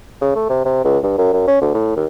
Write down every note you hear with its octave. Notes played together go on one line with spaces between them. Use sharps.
C#3
A3
C3
C3
C#2
G2
F#2
F#2
C#4
D2
A2
D#2